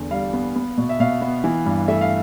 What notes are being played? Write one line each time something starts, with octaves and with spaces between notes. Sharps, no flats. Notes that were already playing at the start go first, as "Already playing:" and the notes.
Already playing: E2 D3
G3 F5
B3
B3
B2
E5
B2 F5
B3
E3
G2
A3 E5
F5